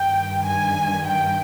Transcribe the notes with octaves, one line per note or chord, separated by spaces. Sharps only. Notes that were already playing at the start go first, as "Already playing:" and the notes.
Already playing: G2 D#3 G5
G#5
G5